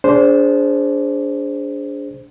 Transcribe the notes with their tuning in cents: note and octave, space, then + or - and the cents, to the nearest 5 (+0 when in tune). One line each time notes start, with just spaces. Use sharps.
D4 -25 G#4 +0 C5 +0